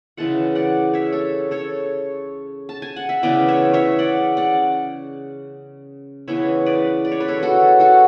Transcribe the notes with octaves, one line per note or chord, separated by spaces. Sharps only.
C#3 E3 G#3 F#5 A5
D5 F#5
C#5 E5
A4 C#5
A4 C#5
A5
G#5
F#5
E5
C#3 E3 B3 B4 D5
C#5 E5
C#5 E5
D5 F#5
D5 F#5
C#3 E3 B3 C#5 E5
B4 D5
D5
C#5
B4
A4 C#5
F#4 A4
F#4 A4